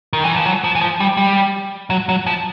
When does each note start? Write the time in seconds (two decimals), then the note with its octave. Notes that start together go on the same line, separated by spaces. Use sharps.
0.13 D#3
0.24 E3
0.35 F3
0.45 F#3
0.64 F3
0.75 E3
0.81 F3
1.00 G3
1.17 G3
1.90 F#3
2.09 F#3
2.26 F3